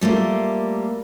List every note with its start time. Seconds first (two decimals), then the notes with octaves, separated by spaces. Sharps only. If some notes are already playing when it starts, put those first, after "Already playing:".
0.01 G3 A3 A#3 F4